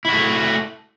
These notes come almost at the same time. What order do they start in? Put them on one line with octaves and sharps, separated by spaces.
E4 F#4 A3